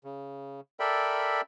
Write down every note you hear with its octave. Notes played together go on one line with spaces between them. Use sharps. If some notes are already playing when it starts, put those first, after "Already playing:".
C#3
A4 A#4 D5 E5 G5 B5